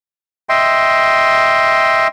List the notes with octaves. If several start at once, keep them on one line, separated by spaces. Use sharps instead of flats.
D#5 E5 G5 C6